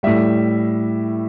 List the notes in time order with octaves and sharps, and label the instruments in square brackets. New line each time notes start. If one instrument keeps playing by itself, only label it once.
[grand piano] A2 G3 E5